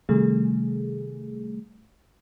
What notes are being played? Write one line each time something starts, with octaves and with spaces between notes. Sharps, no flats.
C3 D#3 G3 A3 G#4